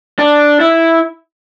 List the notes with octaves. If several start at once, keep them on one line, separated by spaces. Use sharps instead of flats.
D4
E4